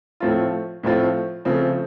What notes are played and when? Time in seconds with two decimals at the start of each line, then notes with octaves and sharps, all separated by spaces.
0.20 A2 F3 A3 C4 F4
0.83 A2 F3 A3 C4 F4
1.45 C#3 F3 A3 C4